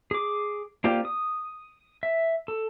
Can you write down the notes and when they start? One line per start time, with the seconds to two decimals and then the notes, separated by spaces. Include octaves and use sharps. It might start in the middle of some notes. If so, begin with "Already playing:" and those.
0.11 G#4 D6
0.84 A#3 C4 F4 G4 D5
1.05 D#6
2.03 E5
2.48 A4